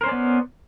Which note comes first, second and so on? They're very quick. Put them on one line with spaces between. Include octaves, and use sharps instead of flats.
A#4 C5 C#4 D5 B3